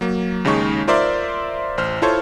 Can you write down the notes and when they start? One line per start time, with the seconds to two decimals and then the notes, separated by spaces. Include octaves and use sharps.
0.01 F#3 A#3
0.45 D#2 C#3 G#3 D#4 C#6
0.87 F4 A#4 C5 D5 E5 C6
1.78 A1 C5 F6
2.02 E4 F4 A4 C5 C#5